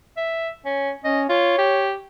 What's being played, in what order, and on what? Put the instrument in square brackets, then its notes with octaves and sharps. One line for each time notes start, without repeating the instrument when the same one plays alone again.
[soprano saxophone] E5
C#4
[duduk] C#4 [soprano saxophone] D#5
[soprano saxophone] F4 [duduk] C#5
[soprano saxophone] G4